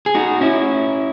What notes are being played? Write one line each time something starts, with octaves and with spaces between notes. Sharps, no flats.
G#4
D#4 F#4
C#4 E4